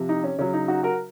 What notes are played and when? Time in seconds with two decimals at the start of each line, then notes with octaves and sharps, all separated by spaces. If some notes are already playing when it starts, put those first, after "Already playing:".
Already playing: C3 F3
0.09 D#4
0.24 C#4
0.38 C#3 F#3 C#4
0.53 D#4
0.68 D#4 F#4
0.83 F#4 A#4